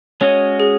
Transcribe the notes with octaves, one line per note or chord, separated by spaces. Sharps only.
G#3 C#4 F#4 C#5 D#5
G#4